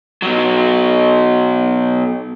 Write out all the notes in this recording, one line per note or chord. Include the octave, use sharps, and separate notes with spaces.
B2 F#3